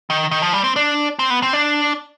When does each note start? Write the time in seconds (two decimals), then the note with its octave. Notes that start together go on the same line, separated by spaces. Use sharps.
0.10 D#3
0.31 D#3
0.42 F3
0.53 G3
0.64 C4
0.76 D4
1.19 C4
1.30 B3
1.42 C4
1.53 D4